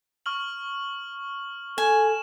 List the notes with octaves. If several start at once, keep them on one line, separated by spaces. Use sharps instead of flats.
C#6 F6 F#7
A4 G#5 E7